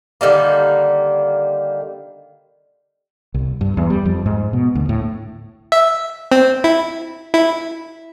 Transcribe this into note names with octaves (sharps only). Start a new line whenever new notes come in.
D3 D#3 G3 A#3
C2
G2
E2
G3
F2
G#2
B2
D2
A2
E5
C4
E4
E4